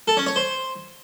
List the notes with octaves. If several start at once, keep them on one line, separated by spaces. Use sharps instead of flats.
A4
C#4
C#5
C5